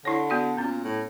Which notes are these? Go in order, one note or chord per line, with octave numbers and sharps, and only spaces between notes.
D3 E4 C#5
B3 F#4 D5
A#2 B3 C#4
A2